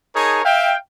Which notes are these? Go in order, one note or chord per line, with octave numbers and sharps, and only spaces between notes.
D#4 G#4 A#4 C#5 A5
E5 F5 G5